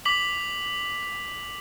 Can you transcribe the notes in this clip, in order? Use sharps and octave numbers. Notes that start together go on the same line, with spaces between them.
D6 B6 F#7